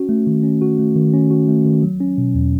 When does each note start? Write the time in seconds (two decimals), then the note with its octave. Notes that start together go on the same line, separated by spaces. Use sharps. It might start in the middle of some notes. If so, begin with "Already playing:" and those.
Already playing: C#4 F#4
0.09 A3
0.27 D#3
0.43 C#4
0.62 F#4
0.79 A3
0.96 D#3
1.13 C#4
1.31 F#4
1.48 A3
1.65 D#3
1.83 F#3
2.00 C#4
2.18 B2
2.35 E2